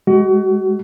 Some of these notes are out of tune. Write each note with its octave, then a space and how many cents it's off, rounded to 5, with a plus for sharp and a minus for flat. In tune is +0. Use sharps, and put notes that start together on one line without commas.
G#3 +0 F#4 +30